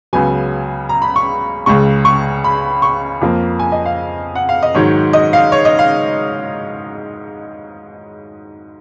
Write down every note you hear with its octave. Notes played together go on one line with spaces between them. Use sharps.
C#2 C#3 F#3 B3 G#5
A#5
B5
C#6
C#2 C#3 G#3 C#6
C#6
B5
C#6
F2 F3 A#3
G#5
D#5
F5
F#5
F5
D#5
G#2 D#3 F#3 C#5
D#5
F5
C#5
D#5
F5